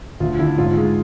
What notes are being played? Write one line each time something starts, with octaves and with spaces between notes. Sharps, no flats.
D2 F4
D3 E4
G#2 F4
G#3